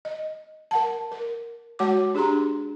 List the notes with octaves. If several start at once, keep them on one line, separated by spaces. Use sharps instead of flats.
D#5
A#4 F#5 A5
A#4
G#3 F#4 C#5 F#5 A5 D6
D4 G4 G#4 A#5 C6